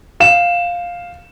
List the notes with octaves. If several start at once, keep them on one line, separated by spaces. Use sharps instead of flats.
F5 E7